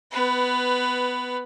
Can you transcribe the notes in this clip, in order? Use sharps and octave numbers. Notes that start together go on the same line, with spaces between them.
B3 B4